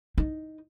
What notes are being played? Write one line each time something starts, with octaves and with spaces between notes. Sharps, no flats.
D#4